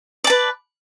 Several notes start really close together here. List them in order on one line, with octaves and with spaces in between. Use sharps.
D5 A5 B4